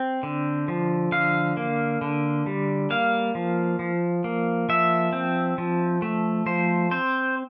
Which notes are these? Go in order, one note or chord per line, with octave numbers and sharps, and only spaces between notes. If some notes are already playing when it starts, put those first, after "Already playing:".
Already playing: C4
D3
F3
D3 F5
A#3
D3
G3
A#3 F5
F3
F3
A#3
F3 E5
C4
F3
A3
F3 C5
C4 C5